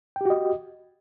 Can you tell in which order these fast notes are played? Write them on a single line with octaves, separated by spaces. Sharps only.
G5 G4 F#4 D#5